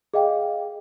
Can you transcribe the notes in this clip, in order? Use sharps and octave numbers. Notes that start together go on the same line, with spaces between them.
G#4 D#5 F5 G5